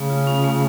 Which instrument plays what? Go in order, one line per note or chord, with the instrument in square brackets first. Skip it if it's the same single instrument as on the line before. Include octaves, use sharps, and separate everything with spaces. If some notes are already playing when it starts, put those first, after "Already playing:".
Already playing: [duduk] C#3 [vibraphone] A3
[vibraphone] F4
C#4
A3